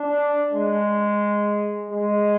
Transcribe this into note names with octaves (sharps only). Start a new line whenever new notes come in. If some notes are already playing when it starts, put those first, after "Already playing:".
Already playing: D4
G#3
G#3